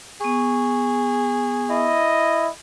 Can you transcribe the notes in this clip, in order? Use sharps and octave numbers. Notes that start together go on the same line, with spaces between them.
B3 G#4 C#6
E4 D#5